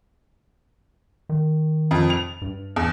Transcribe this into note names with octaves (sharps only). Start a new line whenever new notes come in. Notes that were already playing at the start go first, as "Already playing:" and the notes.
D#3
F2
F7
G2
E2